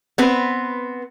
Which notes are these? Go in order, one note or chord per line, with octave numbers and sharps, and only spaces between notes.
B3 C4 B4